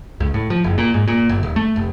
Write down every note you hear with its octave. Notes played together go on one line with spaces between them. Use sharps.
C#2
A2
F3
F#1
A#2
G#2
A#2
G1
D#1
A3
F1